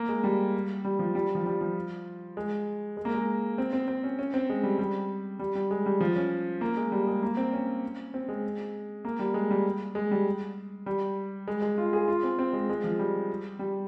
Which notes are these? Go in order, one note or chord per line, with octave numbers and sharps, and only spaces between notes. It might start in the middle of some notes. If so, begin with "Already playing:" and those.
Already playing: A#3
G#3
G3
G3
F3
G3
F3
G3
F3
G#3
G#3
A#3
G#3
C4
C4
C4
C#4
C#4
C4
G#3
G3
G3
G3
G3
G#3
G3
F3
C#4
A#3
G#3
G3
G#3
A#3
C4
C#4
C4
G#3
A#3
G3
G#3
G3
G#3
G3
G3
G#3
G#3
F4
G#4
F4
C4
C4
G#3
G#3
F3
G3
G3